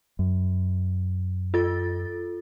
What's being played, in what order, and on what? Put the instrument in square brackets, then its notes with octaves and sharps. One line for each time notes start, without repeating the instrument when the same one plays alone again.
[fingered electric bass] F#2
[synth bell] F4 A4 A6